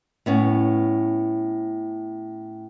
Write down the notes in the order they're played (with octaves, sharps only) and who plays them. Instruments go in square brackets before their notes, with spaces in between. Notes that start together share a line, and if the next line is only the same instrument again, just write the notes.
[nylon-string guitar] A2 B3 C#4